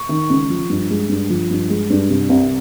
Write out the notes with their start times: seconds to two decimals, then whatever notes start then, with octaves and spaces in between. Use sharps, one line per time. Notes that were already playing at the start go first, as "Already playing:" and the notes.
Already playing: C#6
0.09 D#3
0.30 C#2
0.49 F3
0.69 G2
0.90 G#3
1.09 G2
1.30 F3
1.50 G2
1.70 G#3
1.90 G2
2.09 C3
2.29 C2